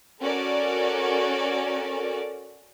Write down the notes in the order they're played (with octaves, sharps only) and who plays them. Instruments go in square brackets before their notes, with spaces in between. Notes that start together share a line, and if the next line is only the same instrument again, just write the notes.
[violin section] C#4 F#4 A4 A#4 D5